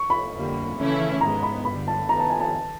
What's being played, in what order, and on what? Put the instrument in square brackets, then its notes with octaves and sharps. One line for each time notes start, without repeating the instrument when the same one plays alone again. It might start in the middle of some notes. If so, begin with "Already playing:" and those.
Already playing: [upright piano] C#6
B5
[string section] F2 D3 G3 A#3
C#3 E3 A3 C#4 E4
[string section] G#2 D#3 G#3 B3 [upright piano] A#5
[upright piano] B5
[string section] G2 D3 G3 [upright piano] B5
[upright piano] A5
[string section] D#3 G3 B3 D#4 [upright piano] A#5
[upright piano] A5
G#5
A5